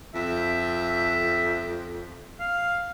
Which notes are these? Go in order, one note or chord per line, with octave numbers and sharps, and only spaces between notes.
F2 E5
F5